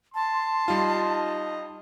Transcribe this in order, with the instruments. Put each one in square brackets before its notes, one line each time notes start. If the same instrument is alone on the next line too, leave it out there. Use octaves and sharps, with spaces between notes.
[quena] A5 [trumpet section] C6
[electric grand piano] G3 F4 [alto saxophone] D#4